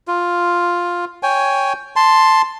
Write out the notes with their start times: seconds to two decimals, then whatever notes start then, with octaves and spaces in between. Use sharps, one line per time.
0.07 F4
1.23 C#5 G5 G#5
1.96 A5 C6